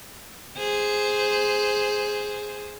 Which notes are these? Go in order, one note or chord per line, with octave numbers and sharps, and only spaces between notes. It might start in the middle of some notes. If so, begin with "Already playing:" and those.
G#4 C5